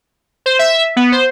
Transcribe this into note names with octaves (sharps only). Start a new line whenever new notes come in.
C5
E5
B3
C5